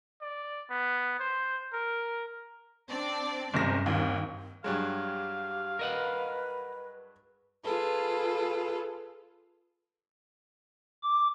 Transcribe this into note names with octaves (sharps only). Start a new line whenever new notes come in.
D5
B3
C5
A#4
C4 D4 D5
F#1 G2 C3 A#6
G#1 D#2
G2 F#3 G#3 G4 F5
A#4 B4 D#5 F#5
F4 G#4 A4 B4
D6